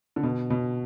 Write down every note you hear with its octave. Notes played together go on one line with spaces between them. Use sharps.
D3
B2
B2